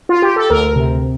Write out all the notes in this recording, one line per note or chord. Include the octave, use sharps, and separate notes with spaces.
F4
G4
A4
D2 A#4
C3